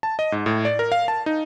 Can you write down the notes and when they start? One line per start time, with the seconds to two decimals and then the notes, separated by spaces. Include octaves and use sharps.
0.03 A5
0.19 D#5
0.32 G#2
0.46 A2
0.65 D5
0.79 A#4
0.92 F5
1.08 A5
1.26 D#4